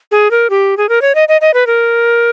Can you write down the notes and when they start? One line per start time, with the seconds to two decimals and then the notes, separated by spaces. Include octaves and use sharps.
0.11 G#4
0.31 A#4
0.50 G4
0.77 G#4
0.89 A#4
1.02 C#5
1.15 D#5
1.28 D#5
1.41 D#5
1.54 B4
1.67 A#4